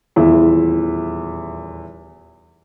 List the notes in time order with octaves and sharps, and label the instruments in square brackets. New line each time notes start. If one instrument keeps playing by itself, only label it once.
[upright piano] D#1 E2 E4 F4